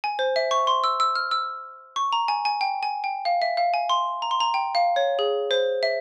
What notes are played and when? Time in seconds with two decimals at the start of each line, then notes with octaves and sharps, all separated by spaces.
0.04 G#5
0.19 C5
0.36 E5
0.51 C#6
0.67 C6
0.84 E6
1.00 E6
1.15 F6
1.31 E6
1.96 C#6
2.13 A#5
2.28 G#5
2.45 G#5
2.61 G5
2.83 G#5
3.04 G5
3.25 F5
3.42 E5
3.57 F5
3.74 G#5
3.90 C6
4.22 A#5
4.31 C6
4.40 A#5
4.54 G5
4.75 F5
4.96 C#5
5.19 G#4
5.51 C5
5.83 E5